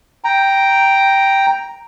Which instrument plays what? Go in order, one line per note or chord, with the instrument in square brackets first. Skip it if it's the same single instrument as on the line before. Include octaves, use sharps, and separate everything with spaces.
[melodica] G5 A#5